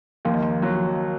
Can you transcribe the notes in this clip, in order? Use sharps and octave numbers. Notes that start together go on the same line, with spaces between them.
D#2 F3
D#3
F3
F3 F#3